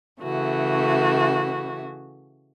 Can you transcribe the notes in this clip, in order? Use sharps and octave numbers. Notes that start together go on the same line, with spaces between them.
C#3 E3 A3 F#4